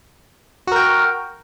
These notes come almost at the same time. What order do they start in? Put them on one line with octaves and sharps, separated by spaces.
F#4 A#4 G5